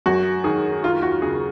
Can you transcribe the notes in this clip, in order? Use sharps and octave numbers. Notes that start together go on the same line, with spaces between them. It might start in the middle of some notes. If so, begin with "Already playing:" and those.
F#2 F#4
D#3 G#4
D#2 F4
F#4
C#3 G#4